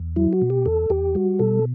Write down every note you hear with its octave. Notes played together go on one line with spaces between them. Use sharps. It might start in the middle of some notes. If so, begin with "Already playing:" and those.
Already playing: E2
F#3 E4
F#4
B2
G4
E2 A4
E2 G4
G3 F#4
B2 A4